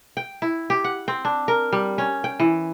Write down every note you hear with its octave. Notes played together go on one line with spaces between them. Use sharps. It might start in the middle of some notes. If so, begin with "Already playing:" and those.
G5
E4
G4
F#5
C4
D4
A#4
G3
C#4
G5
E3